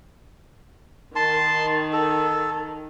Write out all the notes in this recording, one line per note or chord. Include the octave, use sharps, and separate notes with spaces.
D#3 A5 C6
A4